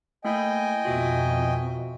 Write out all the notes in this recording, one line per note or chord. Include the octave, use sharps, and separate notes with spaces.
A3 A#3 E4 D#5 G5 G#5
F2 B2 F4 F#4 E5